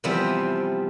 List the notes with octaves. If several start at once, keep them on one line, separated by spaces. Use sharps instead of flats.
C3 E3 F3 G3 B3 C4